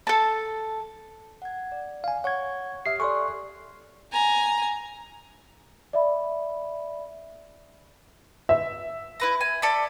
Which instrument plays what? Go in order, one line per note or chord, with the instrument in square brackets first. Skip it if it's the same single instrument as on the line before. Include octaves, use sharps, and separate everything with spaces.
[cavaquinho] A4 A5
[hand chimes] F#5 G#6
D5
[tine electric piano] F5 G#5
[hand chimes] C#5 C#6 [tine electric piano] F#5 G#6
[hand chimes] G4 D#6 F6 [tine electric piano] E5 C7
[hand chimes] A4 G#5 F#6 [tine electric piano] D5 C6 C#6
[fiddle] G#5 A#5
[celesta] D5 E5 B5
[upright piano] E5
[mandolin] E4 B4 A#5
G#5
A4 D5 B5